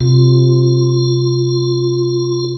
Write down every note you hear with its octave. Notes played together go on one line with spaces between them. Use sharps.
C3 F4